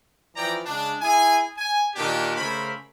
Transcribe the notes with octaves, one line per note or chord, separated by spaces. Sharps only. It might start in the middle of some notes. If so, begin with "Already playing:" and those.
E3 F3 D5 G5 A#5
C#3 G#3 D4
E4 G#4 G#5
G#5
A#2 D#3 D4 F#4 G4
C#3 A3 A#4 C5 B5